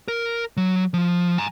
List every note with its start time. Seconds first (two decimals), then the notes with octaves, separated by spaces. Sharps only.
0.08 A#4
0.57 F#3
0.94 F3
1.38 G#5 A#5